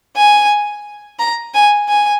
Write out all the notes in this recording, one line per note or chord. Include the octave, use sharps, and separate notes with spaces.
G#5
A#5
G#5
G#5